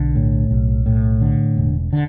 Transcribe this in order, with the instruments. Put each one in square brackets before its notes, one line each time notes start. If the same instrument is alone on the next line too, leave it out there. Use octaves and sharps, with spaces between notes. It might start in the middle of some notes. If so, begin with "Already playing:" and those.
Already playing: [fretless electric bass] B1 D3
A2
B1
A2
D3
E1
D3